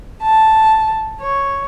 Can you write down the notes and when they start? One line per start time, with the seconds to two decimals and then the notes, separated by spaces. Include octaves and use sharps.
0.22 A5
1.19 C#5